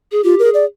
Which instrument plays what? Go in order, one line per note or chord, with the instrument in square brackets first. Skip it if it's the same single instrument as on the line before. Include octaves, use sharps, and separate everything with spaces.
[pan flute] G#4
[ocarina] F4 [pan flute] G4
[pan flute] G#4 [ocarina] A#4
[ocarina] D5